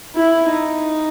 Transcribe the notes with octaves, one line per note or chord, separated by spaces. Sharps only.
E4
D#4